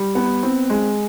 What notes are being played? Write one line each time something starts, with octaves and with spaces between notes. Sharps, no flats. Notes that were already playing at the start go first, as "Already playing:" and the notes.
Already playing: G3
B3
C4
G#3